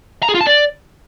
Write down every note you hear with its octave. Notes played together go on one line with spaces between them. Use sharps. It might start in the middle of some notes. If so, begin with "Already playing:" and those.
A#5
G#4
F4
A5
D5